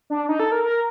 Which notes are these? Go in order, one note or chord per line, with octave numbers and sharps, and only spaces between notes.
D4
D#4
A4
A#4
A#4